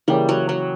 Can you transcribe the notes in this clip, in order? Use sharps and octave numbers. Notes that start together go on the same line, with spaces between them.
C#3 E3 G3 A#3 C#4 G4
F#3
F#3